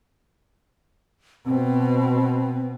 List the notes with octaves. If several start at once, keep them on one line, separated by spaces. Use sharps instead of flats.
B2 C4